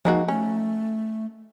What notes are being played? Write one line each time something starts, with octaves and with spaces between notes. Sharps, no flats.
F3 G#3 A#3 D#4 F#4
A3 C#4